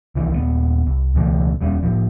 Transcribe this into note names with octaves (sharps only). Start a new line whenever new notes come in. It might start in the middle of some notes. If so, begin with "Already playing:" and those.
C2 D#3 E3
D#1 B3
C2
C#2 B2 E3 A3
E1 G3 C#4
A2 F3